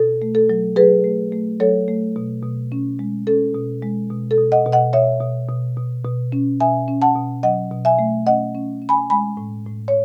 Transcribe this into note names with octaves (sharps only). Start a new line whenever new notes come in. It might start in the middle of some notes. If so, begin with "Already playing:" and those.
Already playing: B2 A4
A3
A4
F#3
F#3 G#4 B4
A3
A3
F#3 A4 C#5
A3
B2
B2
C#4
G#3
C#4 A4
B2
G#3
B2
A4
B2
D#5 F#5
B2
D#5 F#5
B2 C#5 E5
B2
B2
B2
B2
C#4
B2 E5 G#5
C#4
F#5 A5
B2
F#3 D#5 F#5
B2
E5 G#5
A3
C#4 D#5 F#5
C#4
C#4
G#5 B5
G#3 G#5 B5
A2
A2
C#5